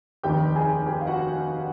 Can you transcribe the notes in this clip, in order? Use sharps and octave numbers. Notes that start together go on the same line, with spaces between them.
F1 D#2 D#3 G4 G5
G#4 G#5
G4 G5
F5
F#4 F#5